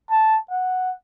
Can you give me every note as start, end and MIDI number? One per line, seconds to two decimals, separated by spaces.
0.10 0.37 81
0.51 0.91 78